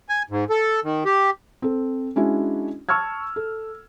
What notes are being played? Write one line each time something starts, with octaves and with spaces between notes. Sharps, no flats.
G#5
G#2
A4
D#3
G4
C4 A4
G#3 C#4 D4 E4 F#4
A5 C#6 E6 F6 G#6
A4